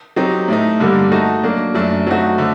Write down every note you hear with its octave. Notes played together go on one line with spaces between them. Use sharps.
F#3 C4 D#4 G4
A2 A3 D#4
G2 D3 G3 A#3
A3 D#4 F#4 A4 D#5
F#3 A#3 D4
F#2 F#3 A3 D4
F#3 A3 C4 D#4 F#4
D3 A3